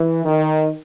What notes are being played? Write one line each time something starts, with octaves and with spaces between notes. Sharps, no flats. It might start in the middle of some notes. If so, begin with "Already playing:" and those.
Already playing: E3
D#3